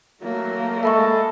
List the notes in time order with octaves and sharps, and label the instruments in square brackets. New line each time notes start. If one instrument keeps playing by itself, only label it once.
[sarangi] F#3 [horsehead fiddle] A3 A#3
[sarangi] G#3 [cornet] A4 [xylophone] E5 B5 C#6